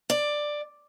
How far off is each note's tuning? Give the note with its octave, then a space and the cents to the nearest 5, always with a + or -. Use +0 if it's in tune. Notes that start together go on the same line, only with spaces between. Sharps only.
D5 +10